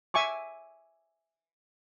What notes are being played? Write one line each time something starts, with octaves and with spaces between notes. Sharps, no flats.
E5 G#5 C#6 D6